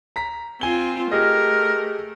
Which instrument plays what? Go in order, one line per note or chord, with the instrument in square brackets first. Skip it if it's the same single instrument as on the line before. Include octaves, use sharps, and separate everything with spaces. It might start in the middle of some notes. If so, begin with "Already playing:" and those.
[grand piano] A#5 B6
[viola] C4 F4 [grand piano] G#5 G7
[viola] A3 [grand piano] G4 G#4 D#5 [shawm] A#4